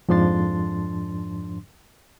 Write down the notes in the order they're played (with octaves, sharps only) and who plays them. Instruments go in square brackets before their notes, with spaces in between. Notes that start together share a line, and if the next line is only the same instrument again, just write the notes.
[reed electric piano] F2 G#2 F3 D4 C6 A6